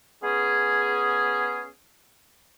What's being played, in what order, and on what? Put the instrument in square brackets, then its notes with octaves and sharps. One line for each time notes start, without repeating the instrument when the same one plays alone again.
[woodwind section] B3 C#4 G#4